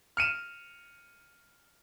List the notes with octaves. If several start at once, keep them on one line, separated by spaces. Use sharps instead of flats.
F6 C#7 D#7 E7